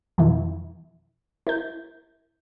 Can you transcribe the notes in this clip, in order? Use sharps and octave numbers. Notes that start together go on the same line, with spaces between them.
F2 B2 E3 E4
E4 A#4 G6